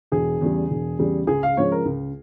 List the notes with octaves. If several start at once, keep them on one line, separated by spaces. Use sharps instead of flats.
E1 G#4
E2 C#3 G3
E1
E2 C#3 G3
C#2 G#4
F5
C#3 F3 G#3 C#5
A#4
C#2